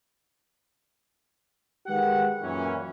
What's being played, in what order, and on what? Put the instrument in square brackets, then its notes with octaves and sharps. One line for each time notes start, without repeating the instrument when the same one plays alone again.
[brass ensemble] D#3 G#3 G4 B4 F#5
F#2 A#2 E3 C#4